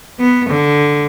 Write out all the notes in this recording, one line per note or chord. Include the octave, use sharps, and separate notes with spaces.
B3
D3